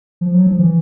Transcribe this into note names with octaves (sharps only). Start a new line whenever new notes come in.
F3
F#3
F3
E3